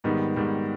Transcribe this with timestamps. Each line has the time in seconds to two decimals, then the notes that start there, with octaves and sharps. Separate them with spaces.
0.04 G#2 D#3 G3 B3
0.36 G#2 D#3 G3 B3